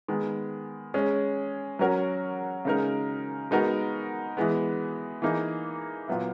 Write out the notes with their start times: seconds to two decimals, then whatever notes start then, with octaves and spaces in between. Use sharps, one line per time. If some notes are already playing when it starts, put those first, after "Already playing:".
0.08 D#3 G#3 B3
0.94 G#3 C#4 G#4
1.79 F#3 C#4 F#4 A#4
2.65 C#3 G#3 D#4 A#4
3.51 G#3 B3 D#4 F#4 A#4
4.37 E3 G#3 B3
5.22 E3 A#3 D#4 G#4
6.08 A#2 F#3 B3 E4